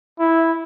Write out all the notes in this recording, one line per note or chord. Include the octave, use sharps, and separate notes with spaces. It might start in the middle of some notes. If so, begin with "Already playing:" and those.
E4